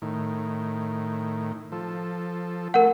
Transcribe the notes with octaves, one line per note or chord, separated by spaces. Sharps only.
A2 D#3
F3 A4
A3 A#4 F#5